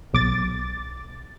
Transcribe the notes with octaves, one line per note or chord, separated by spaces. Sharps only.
B1 D6 A6